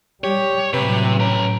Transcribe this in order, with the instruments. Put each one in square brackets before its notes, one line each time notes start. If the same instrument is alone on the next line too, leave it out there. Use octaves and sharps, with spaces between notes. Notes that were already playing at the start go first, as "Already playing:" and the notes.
[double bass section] G3 [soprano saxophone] G4 [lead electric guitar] C#5
[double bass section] A2 F#3 [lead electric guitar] C3 [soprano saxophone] B4
[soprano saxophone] C#4 [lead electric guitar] B4 A#5